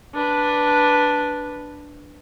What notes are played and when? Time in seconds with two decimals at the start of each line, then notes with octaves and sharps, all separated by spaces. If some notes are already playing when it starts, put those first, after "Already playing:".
0.14 D4 B4